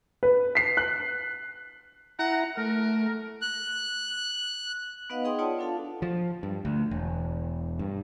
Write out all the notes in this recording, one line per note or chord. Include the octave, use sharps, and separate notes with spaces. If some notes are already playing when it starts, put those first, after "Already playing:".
B4
B6 C7
F#6
E4 F#5 A#5
A3 A#4
F#6
B3 D#4 B4 D#5 F5 F#5
D#4 G#4 D#5 G5 C6 D#6
F4 C#5 D5 F#5 A5
D4 F4 A4 F5 A5
F3
G2
D2
E1
G2